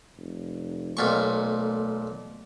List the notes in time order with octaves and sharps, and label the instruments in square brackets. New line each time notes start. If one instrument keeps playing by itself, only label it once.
[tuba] F1
[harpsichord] B1 A#2 C#6 [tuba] A3